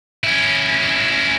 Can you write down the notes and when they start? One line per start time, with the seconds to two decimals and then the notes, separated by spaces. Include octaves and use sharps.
0.24 C#4 E4